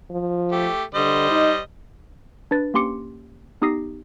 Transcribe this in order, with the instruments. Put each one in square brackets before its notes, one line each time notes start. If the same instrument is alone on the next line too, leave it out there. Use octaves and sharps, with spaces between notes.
[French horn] F3
[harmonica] A3 G4
[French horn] D3 [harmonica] G3 C5 D#5
[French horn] D#4
[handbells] D4 B4 A6
A#3 C#4 G4 C6 D6 C#7
B3 D#4 G4 D#6 A#6 C7